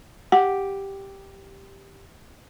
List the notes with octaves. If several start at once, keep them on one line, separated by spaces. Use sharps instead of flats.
G4 F#5